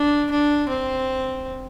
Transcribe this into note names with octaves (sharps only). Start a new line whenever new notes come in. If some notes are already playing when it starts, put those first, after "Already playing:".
Already playing: D4
D4
C4